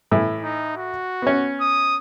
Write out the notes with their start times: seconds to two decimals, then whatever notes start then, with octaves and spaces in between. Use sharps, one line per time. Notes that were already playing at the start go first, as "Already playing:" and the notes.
0.12 A2 E3 E4
0.42 D#4
0.77 F#4
1.22 B3 C#4
1.61 D#6